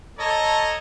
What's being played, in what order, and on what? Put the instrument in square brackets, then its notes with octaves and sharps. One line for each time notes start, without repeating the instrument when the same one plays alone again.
[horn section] A4 C#5 D#5 A5 A#5